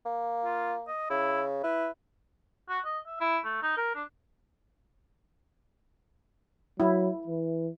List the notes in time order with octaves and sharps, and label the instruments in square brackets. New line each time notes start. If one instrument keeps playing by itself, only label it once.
[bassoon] A#3
[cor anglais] F4
D#5
[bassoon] C#3 [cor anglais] E4
[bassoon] E4 [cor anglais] B4
[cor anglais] F#4
D#5
E5
E4
A3
D#4
A#4
D4
[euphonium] F#3 [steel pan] E4
[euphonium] E3